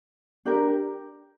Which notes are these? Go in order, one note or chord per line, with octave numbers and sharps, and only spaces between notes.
D4 G4 A#4